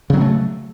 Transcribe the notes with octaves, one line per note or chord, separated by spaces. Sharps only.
C#3 F#3 A3 C4